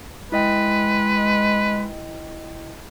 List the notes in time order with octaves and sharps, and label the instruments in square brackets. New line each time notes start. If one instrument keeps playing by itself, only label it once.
[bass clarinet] G#3 [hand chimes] E4 D#5 G5 [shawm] B4